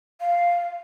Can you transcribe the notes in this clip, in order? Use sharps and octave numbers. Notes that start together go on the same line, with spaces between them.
F5